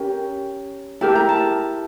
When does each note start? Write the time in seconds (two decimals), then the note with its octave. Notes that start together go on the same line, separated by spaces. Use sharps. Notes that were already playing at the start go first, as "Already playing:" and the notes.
Already playing: C#4 G4 A#4
1.01 E4 G4 A#4 A5
1.15 A#5
1.29 A5